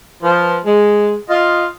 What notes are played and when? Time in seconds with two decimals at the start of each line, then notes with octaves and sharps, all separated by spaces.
0.22 F3 B4
0.66 G#3
1.28 F4 D#5